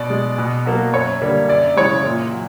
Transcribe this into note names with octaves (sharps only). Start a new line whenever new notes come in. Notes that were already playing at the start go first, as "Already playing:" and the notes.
Already playing: B2 D5
G#3
B2
F#3 A#3
F#2 C#5
D3 G3 A#3
F#2 D5
C#3 E3 G#3 C#5
A#2
F#3